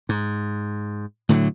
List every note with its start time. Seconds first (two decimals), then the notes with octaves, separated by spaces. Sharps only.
0.09 G#2
1.29 A2 D3 D#3 F#3